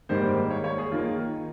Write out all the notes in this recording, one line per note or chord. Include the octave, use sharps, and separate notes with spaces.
G#2 D#3 G3 A#3 C5
C#5
C#5
G#4
D#3 A#3 F4